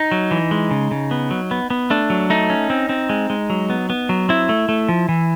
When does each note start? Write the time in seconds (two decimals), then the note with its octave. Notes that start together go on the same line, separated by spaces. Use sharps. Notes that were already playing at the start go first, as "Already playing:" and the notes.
Already playing: D#4
0.12 F#3
0.31 E3
0.51 G#3
0.71 C#3
0.91 C#3
1.11 B3
1.31 F#3
1.51 B3
1.70 B3
1.90 A3 D4
2.10 F#3
2.30 A3 D#4
2.50 C#4
2.70 C4
2.89 C4
3.09 G#3
3.30 G#3
3.50 F#3
3.70 B3
3.90 B3
4.09 F#3
4.29 C4 E4
4.49 A3
4.69 A3
4.89 F3
5.09 E3